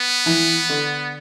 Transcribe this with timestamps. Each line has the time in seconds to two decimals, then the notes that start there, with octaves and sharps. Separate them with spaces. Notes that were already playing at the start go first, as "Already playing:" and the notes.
Already playing: B3
0.26 E3
0.69 D3